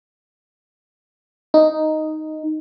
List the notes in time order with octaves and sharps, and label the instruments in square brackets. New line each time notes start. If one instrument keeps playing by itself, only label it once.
[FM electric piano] D#4